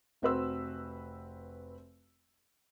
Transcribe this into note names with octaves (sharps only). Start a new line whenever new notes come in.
F1 C4 F#4 B4 C6 E6